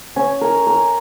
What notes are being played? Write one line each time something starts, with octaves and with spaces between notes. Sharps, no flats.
C#4
A#4
A#4